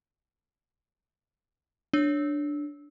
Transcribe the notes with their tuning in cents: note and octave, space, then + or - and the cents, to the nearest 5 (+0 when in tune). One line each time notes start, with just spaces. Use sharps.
D4 +0 C#5 +5 E6 -15